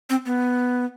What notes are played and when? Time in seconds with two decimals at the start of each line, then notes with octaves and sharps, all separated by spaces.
0.10 C4
0.26 B3